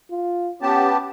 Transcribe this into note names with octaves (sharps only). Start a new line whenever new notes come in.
F4
B3 C#4 G4 A5